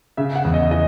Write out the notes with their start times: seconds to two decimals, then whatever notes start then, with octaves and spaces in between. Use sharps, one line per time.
0.17 C#3 E5
0.36 F#5
0.45 E2
0.54 D#5
0.71 E3 D#5